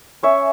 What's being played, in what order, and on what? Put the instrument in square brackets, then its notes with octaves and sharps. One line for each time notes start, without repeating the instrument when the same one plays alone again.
[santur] C#4 C#5 E5